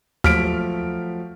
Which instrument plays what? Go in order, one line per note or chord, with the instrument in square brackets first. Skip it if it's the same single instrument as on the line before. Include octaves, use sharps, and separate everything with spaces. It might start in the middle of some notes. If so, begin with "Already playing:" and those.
[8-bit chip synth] D#2 [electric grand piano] F3 F#3 A3 [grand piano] F6 B6 D7